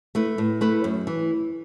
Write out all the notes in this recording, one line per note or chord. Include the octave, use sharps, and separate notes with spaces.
A3 E4 B4
A2
A3 E4 B4
F#2
E3